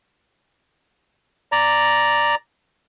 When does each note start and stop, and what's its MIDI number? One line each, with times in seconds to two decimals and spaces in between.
1.52 2.35 74
1.52 2.35 82